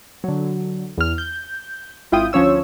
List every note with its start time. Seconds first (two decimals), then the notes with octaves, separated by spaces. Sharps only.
0.24 D3 F#3
0.98 E2 F6
1.18 G6
2.12 G#1 E4 F4 G5 D#6
2.33 D2 F3 C#4 C#5 E6